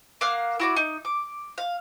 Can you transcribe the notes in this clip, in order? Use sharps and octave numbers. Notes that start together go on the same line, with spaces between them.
A#3 F5 F#5 F6
E4 F#4 D5
D#4
D6
F5